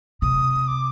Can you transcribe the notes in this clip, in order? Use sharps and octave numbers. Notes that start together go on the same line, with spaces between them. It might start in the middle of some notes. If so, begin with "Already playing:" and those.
C3 D#6
D6